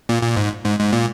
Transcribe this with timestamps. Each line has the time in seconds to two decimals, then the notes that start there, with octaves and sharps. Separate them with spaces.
0.09 A#2
0.23 A#2
0.37 G#2
0.65 G#2
0.79 G#2
0.93 A#2